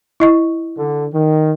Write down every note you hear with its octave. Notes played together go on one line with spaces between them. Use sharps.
E4 D#5 C#6
D3
D#3